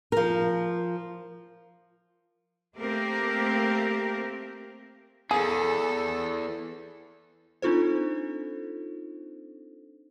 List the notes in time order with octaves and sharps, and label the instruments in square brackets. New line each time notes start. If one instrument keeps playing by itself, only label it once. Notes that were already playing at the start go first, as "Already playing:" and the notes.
[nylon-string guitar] F3 A#4
[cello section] A3 A#3 C4 G4 A#4
[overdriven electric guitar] E2 [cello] E3 A4 [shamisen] A#3 G#4
[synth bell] C4 D4 D#4 F4 A4 C5